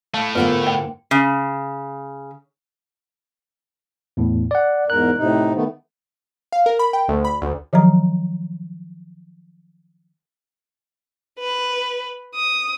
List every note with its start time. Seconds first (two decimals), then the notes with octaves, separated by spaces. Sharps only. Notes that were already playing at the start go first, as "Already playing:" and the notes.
0.14 A2 A3 F5 A5
0.35 G#2 D3 A#3 B3 F4 B4 F#5
0.67 G5
1.11 C#3
4.17 E2 A2
4.51 D5 F#5
4.90 E2 G#2 A#4 F#6
5.18 A2 C3 D#4
5.54 D#3 A3 B3
6.52 F5
6.66 A#4
6.79 B5
6.93 G5
7.08 D2
7.25 B5
7.42 D2
7.73 D#3 F3 F#3 A#5
11.40 B4
12.35 D#6